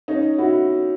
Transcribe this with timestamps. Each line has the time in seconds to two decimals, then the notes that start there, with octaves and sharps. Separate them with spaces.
0.08 C#4 D#4
0.38 E4 F#4